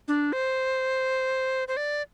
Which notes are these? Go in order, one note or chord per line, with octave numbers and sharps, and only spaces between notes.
D4
C5
C5
D5